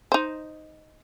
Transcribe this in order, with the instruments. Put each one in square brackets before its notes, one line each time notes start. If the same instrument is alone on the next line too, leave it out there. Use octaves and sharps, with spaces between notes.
[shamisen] D#4 C5